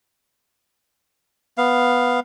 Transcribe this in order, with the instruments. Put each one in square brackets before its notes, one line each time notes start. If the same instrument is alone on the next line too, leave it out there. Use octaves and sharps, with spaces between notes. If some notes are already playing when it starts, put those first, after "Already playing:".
[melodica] B3 F5